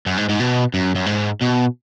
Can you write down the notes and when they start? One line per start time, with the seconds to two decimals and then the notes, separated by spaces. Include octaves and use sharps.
0.07 F#2
0.17 G#2
0.29 G#2
0.40 B2
0.74 F#2
0.95 F#2
1.06 G#2
1.41 B2